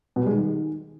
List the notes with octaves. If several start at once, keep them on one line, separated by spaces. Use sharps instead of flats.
B2
G3
G#3
D#3